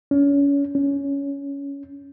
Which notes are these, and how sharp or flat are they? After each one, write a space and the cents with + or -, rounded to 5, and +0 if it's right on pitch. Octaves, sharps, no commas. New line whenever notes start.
C#4 +30
C#4 +15